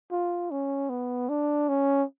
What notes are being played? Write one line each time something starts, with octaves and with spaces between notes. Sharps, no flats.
F4
C#4
B3
D4
C#4